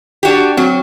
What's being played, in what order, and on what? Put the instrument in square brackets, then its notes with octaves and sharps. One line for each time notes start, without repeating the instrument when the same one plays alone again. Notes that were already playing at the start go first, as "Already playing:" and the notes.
[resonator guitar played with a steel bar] D4 F#4 G4
[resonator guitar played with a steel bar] F#3 [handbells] C4 F#4